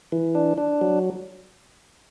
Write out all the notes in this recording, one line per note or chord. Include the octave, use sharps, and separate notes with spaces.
E3
D4
D4
F#3